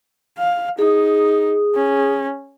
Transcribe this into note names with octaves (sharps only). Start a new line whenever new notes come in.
F5
D#4 G#4 D#6
C#4